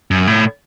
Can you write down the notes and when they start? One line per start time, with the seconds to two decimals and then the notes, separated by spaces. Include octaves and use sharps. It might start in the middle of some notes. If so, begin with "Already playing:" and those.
0.11 F#2
0.27 A2